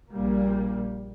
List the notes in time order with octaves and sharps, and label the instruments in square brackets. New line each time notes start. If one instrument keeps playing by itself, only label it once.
[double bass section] A#1 A#2 G3 A#3